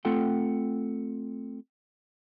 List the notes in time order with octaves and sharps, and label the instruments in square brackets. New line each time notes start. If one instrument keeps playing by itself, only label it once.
[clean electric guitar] A3 C4 F4 A4 F#5 G5